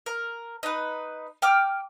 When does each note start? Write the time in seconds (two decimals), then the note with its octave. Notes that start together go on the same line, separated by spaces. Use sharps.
0.06 A#4
0.63 D#4 B4
1.42 G5 D6 F6